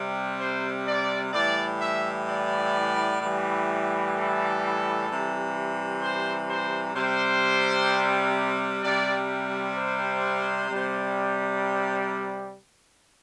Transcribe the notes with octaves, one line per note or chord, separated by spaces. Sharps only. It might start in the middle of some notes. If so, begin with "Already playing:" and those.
Already playing: C3 G3
C5
D5
A2 E3 G3 D5
E5
D5
A2 E3 G3
A4
C3 E3 G3
C5
C5
C3 G3 C5
C3 G3 D5
C5
C3 G3